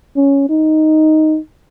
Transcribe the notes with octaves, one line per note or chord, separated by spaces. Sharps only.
C#4
D#4